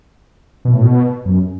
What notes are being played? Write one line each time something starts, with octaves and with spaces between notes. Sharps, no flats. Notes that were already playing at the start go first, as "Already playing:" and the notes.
B2
A2
B2
F#2